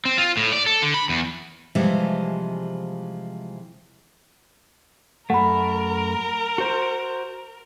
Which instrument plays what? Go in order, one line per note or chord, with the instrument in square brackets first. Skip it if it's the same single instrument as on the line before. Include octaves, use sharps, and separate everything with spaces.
[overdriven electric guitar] C4
F4
A2
D5
A4
D3
B5
E2
[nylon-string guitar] C3 E3 F3 G3 G#3
[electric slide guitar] F#2 A3 [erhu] A#4 [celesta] F#5 B5
[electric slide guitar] F#4 C5